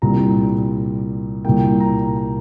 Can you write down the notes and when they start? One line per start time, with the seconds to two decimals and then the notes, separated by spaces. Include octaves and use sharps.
0.02 C2 A#2 G3 C4 A#5
1.45 C2 A#2 G3 A#3 G5
1.80 A#5
2.16 A#5